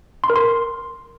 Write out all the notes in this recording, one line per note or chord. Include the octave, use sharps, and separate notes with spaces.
C6
A#4
C6